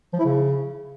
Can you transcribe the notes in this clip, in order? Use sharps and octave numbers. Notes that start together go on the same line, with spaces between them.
F3
E4
C#3